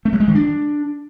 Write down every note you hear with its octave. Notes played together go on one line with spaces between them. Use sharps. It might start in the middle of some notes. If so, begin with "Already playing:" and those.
A3
F#3
G#3
D#3
D4